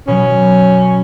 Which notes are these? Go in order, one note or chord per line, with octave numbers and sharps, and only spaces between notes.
B2 F#3 C#4